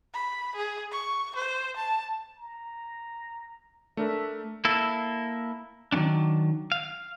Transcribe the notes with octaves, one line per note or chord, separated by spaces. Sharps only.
B5
G#4
C#6
C5
A5
A#5
A3 D4 A#4 E5
A#3 E4 A4
D#3 F#3 A#3 C#4 D4
F5